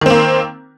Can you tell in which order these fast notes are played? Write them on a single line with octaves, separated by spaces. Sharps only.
D#3 C4 A#3